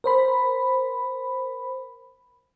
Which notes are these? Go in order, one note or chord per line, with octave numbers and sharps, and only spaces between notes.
A#4 C5 B5